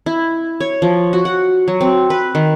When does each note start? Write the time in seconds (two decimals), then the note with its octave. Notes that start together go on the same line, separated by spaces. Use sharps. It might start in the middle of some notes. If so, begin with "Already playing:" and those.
0.06 E4
0.60 C#5
0.82 F3
1.13 F#4
1.25 F#5
1.68 F#3
1.81 C4
2.10 B4
2.35 D#3